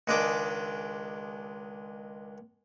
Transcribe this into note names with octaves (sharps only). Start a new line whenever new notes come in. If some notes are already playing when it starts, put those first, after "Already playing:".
C#2 D#3 G#3 D4 G5 D6